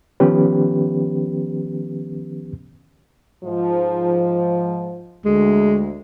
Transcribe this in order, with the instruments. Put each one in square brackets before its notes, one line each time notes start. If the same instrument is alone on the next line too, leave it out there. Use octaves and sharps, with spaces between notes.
[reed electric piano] D#3 F3 B3 C#4 G4 B4
[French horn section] G#2 F3
[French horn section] D2 [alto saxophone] G#3